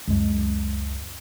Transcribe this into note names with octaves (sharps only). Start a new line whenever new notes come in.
C#2 F#2 G#3